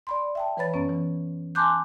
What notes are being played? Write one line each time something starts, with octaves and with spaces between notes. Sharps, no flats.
D5 B5 C6
E5 G5 A5
E3 B4 C#5 B5 A6
F#2 B3 C#4
E3
G#5 A5 C6 D6 F#6 G6